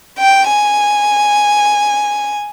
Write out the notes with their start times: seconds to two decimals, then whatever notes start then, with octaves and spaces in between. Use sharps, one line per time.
0.18 G5
0.48 G#5